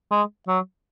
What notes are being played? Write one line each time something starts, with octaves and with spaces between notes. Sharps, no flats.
G#3
F#3